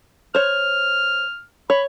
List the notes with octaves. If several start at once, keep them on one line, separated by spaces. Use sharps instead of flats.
C5 C#5 F6
C#5 B5